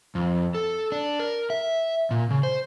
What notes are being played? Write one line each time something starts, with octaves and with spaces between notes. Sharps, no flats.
F2
A4
D4
A#4
E5
A#2
C#3
C5